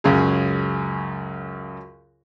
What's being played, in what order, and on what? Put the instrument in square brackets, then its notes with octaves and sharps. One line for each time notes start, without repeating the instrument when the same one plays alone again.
[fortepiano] C#2 F#2 C#3 G#4